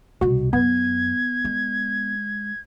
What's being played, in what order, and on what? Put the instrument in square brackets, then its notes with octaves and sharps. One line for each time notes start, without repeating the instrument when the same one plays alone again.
[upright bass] C2 B2 [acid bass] F#4
[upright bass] F#2 [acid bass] B3 [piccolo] G#6
[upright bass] G#3